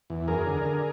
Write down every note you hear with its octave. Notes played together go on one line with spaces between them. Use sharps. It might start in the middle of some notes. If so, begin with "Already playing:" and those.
E2
F#2 G#4 A#4
D3
D3